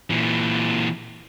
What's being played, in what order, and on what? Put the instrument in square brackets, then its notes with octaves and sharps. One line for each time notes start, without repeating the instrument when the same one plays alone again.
[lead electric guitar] A#2 E3